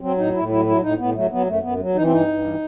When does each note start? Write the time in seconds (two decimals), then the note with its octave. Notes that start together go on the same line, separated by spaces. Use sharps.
0.01 F#3 C4
0.17 A2 D#4
0.33 A2 E4
0.49 F#3 E4
0.66 F#3 E4
0.82 A2 D#4
0.98 A2 B3
1.15 F#3 A3
1.31 F#3 B3
1.47 F#2 A3
1.63 F#2 B3
1.79 F#3
1.95 E3 D#4
2.04 C4
2.11 G2 D#4
2.28 G2
2.45 E3